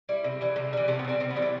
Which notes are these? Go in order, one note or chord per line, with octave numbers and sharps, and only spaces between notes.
G3 E4
C3
E3 G3
C3
E3 G3
C3 A3
B3
E3
G3 C4
C3 C4
B3
E3 G3
A3